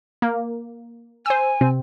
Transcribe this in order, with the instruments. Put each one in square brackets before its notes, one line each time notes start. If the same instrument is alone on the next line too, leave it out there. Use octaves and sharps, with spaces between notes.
[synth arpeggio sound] A#3
[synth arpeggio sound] C5 E6 [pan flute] G#5
[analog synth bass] C3 [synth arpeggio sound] C4